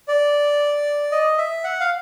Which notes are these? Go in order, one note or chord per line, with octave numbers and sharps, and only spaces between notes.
D5
D#5
E5
F#5
F5